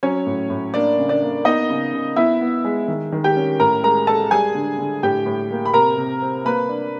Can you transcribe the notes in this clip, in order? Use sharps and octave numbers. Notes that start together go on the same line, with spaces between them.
F#3 C#4 C#5
A2
A2
A#3 D4 D5
C#3
D4 D5
A#3
B3 D#4 D#5
C#3
C#3
B3 E4 E5
B3
G#3
D#3
D#3
G4 G5
C#4
A2 A#4 A#5
G#3 A#4 A#5
G#3 A4 A5
G3 G#4 G#5
D3
D3
A2 G4 G5
A2
A#3
B5
C3 A#4 A#5
C3
C4
A#3 B4 B5
D4